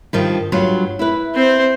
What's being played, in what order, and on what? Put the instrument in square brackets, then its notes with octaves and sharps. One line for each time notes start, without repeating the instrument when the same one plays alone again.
[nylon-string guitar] G2 D#3 F3
G2 F#3 F4
E4 B4
[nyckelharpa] C4 C5